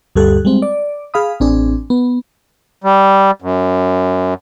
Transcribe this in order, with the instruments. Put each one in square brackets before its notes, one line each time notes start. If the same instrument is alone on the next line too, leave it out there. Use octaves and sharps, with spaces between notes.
[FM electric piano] D2 G2 G3 G4 A4 F#6
G3 G#3 C4
D5
G#4 F5 B5 D#6
A1 C4 D4 G#4
B3
[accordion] G3
F#2